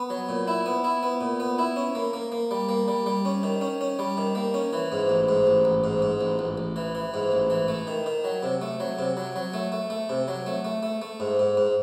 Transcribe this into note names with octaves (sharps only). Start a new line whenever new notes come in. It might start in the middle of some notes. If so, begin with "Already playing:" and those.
Already playing: B3
F#3
A#2
E4
B3
E4
B3
A#2
B3
E4
C#4
A#3
A#3
A#3
G3
A#3
G3
G3
C#4
D#3
C#4
C#4
G3
D#3
A#3
C#4
E3
G#2
A1
G#2
A1
A1
G#2
G#2
A1
A1
A1
E3
E3
G#2
A1
E3
A3
D#3
D#3
F#3
C3
A3
F#3
C3
F#3
F#3
A3
A3
A3
C3
F#3
A3
A3
A3
A3
G#2
G#2
G#2